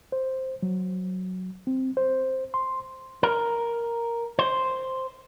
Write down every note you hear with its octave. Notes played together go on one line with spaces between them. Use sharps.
C5
F#3
C4
C5
C6
A#4
C5